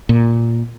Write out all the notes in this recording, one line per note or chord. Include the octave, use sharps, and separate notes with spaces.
A#2